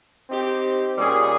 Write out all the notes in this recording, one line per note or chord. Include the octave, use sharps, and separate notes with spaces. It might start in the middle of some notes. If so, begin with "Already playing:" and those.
C4 D#4 G4
A#2 G3 C#4 G#4 D#5